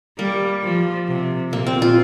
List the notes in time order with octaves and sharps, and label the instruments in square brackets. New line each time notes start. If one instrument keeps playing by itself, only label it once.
[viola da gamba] G3 [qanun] A#3
[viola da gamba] F3
C3
[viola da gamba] A#2 [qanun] A#3
[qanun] C4
F4